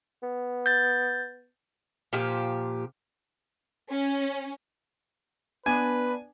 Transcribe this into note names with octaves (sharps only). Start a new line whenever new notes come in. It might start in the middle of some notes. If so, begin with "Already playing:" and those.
B3
G6 A6
A#2 F3 G4
C#4
B3 D4 B4 G#5